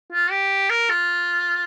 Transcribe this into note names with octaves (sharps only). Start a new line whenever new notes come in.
F4
G4
A#4
F4